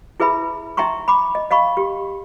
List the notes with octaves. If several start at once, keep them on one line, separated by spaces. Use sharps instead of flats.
E4 G#4 B4 E5 B5
D#4 E5 G5 A#5 C6 C#6
B5 D6
D#5
D#5 F5 B5 C#6
G4